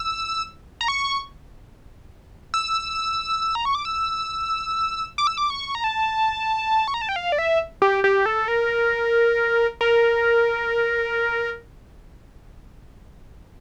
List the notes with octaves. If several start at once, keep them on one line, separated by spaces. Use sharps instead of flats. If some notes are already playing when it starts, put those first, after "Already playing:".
Already playing: E6
A#5
C#6
E6
A#5
C#6
D6
E6
D6
E6
D6
C#6
A#5
A5
C#6
A#5
A5
G5
F5
D5
E5
G4
G4
A4
A#4
A#4